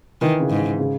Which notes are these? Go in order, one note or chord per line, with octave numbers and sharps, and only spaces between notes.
D#3 E3
C#3
G#2
C#3